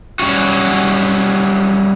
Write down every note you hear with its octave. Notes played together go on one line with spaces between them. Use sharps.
F#3 G3 C#4 F4 F#4